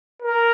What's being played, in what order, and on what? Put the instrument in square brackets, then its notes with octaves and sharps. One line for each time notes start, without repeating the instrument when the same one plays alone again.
[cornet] A#4